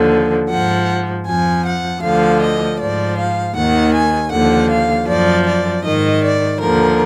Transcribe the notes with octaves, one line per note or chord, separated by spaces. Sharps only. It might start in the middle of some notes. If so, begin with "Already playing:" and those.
Already playing: D#2 D3 F3
G#2 F3 F#5
F2 F3 G#5
F#5
D2 D3 F3 F5
D#5
G#2 F3 D5
F5
D#2 D#3 F#5
G#5
D#2 D3 F3 F#5
F5
F#2 F3 D5
D5
G#2 D#3 D#5
D5
D#2 D3 F3 A#4